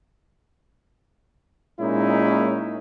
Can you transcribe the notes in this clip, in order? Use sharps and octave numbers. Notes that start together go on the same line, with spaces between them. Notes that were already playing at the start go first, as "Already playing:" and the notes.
A#2 G#3 C#4 D#4 E4